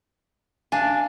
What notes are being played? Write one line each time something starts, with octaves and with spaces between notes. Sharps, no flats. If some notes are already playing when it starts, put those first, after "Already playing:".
D4 F5 G#5